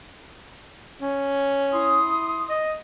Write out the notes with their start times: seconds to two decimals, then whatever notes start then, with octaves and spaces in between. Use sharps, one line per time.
1.01 C#4
1.72 E4 C6 D#6
2.49 D#5